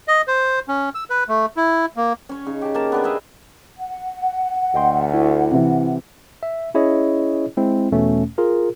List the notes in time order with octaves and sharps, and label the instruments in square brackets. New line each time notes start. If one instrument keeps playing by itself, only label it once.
[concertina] D#5
C5
C#4
E6
B4
A3
E4
A#3
[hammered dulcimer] C#4 C#5
C#3 D#4
G4 A5
A#3 A#4 A5
B3 D4 A#4
G#4 B4 D#5 E5
[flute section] F#5
[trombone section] D2 [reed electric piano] D#5 G5 C6
[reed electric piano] E4
[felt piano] C3 E3
[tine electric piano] E5
C#4 E4 G#4 C#5 D#5
G#3 C4 E4
E2 B2 A3 C#4
F4 G#4 A#4